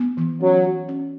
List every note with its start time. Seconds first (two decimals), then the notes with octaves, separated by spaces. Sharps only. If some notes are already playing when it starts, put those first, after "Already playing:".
Already playing: B3
0.17 E3
0.41 F#3 C#4
0.64 F#4
0.88 C#4